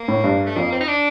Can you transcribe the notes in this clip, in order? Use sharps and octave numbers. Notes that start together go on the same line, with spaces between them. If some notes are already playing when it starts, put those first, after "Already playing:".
Already playing: A#3
A2
G2
A3
F2 A#3
C4
D#4
D4